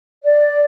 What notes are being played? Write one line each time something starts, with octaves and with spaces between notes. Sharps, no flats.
D5